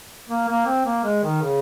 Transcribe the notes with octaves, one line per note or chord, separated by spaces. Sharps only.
A#3
A#3
C4
A#3
G#3
D#3
C#3